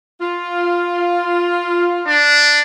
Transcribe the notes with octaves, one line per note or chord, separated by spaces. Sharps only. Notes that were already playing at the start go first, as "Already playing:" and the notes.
F4
D4